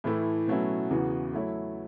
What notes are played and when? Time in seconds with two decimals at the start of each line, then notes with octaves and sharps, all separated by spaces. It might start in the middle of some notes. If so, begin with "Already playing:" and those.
0.04 A2 E3 A3 E4
0.48 B2 F#3 A3 C#4 E4
0.91 E2 C#3 E3 B3 F#4
1.33 F#3 A3 E4 C#5